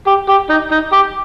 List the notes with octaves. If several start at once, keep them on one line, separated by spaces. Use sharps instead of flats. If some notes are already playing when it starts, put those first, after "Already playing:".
G4
G4
D#4
D#4
G4